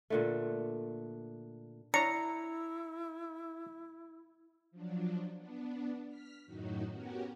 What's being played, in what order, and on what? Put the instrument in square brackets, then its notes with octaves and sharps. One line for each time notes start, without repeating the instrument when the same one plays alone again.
[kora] A#2 D3 A3
[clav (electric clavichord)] D4 C#5 [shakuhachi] E4 [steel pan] A#5 [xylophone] C#7
[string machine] F3 F#3 D4
B3 D4
F6 B6
F#2 A2 D#3 F#3 D#4 F#4
B3 C#4 F#4 G4 A#4